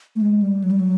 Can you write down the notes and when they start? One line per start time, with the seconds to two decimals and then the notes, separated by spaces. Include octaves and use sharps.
0.16 A3
0.21 G#3
0.42 G3
0.64 F#3
0.71 G3
0.80 F#3